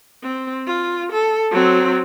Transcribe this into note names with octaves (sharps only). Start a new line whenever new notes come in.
C4
F4
A4
F#3 C4